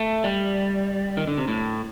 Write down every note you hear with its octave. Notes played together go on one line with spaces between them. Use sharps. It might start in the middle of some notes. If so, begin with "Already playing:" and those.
Already playing: A3
G3
D#3
D3
C3
A2